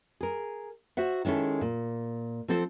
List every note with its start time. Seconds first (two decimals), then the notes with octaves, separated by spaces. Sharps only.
0.21 G#4 A#4
0.97 F#4 C5 E5 F#5
1.25 D#3 G#3 C#4 E4 A4
1.61 A#2
2.48 F3 C4 A4 C5